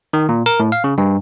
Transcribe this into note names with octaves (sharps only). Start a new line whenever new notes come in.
D#3
A#2
A#4
A2
F5
C#3
G2